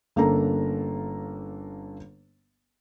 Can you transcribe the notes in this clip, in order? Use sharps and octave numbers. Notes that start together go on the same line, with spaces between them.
G1 A#3 C#4 D4 A4 A#5